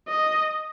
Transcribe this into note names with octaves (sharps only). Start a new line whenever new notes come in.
D#5